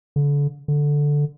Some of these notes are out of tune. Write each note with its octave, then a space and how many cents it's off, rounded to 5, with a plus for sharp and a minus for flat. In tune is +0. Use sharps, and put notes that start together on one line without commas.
D3 -35
D3 -5